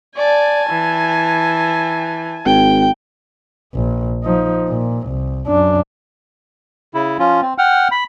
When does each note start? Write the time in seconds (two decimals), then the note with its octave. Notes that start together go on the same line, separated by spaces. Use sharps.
0.17 D5 G#5 A5
0.70 E3
2.46 G#1 G5
3.75 A#1
4.24 F3 D#4
4.69 A#2
5.08 C2
5.47 F#2 D4
6.94 C#3 E4
7.19 F3 C#4 F4
7.42 C4
7.58 F#5 G5 F6
7.91 B5